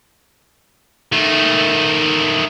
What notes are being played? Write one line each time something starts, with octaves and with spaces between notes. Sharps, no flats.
D#3 A3